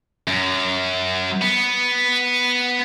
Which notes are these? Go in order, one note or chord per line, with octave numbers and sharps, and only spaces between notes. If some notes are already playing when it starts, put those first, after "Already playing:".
F#2
B3